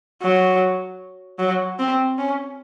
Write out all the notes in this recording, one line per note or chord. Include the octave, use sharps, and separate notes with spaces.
F#3
F#3
C4
C#4